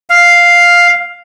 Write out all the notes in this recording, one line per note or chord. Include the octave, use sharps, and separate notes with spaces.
F5